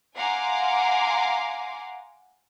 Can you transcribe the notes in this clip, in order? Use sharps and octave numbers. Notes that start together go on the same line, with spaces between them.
F5 F#5 G#5 A#5 C6 D6